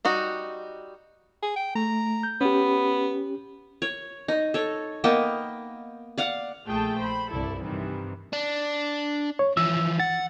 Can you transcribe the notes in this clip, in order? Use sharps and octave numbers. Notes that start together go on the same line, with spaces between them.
G3 D#4 F#4
G#4
G5
A3 A#5
G6
B3 C#4 G4
C#5
D#4
A4 C#5
A#3 B3 D#5 G5
D5 F5 F#5
A#1 A3 G#4 G5 A5
C5 B5
C2 G2 E4 A4 D5
G2 C3 D#3 E3 G3
D4
C#5
E3 F3 E6
F#5 A6